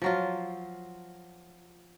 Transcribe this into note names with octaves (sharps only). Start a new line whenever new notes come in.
F3 F#3 F4